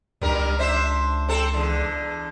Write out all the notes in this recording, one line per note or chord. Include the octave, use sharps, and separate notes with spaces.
C#2 G2 G3 A#4
D4 C5 E5
C4 A4
E2 D3